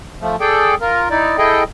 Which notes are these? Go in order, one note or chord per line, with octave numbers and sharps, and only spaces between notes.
F3 A3
G#4 A4 D5 G5
F4 A#4
D#4 E4 D5
E4 G#4 A4 D#5 G5